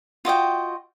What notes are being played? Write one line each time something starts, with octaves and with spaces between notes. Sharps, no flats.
F4 F#4 D#5 G5